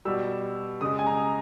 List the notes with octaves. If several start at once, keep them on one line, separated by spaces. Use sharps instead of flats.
B2 G3 E6
C#3 G#3 D#6
G#5
A#5